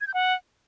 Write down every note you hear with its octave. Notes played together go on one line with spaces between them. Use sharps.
G#6
G6
F#5